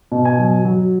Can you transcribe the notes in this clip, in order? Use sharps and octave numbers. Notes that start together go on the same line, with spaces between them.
B2
G#5
F#3
F#3